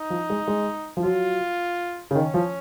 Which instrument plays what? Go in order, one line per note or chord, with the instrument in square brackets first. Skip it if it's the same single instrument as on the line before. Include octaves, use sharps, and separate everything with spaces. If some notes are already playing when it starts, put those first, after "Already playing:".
Already playing: [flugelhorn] D#4
[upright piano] F3
G#3
G#3
F3
[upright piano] F#3 [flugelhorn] F4
[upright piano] C#3
[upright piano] D#3 [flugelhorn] C#4
[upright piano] F3